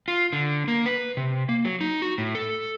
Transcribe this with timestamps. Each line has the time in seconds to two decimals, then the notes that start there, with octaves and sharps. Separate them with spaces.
0.08 F4
0.33 D3
0.68 A#3
0.86 B4
1.17 C3
1.49 A#3
1.65 F#3
1.81 D#4
2.02 F#4
2.18 A2
2.35 A4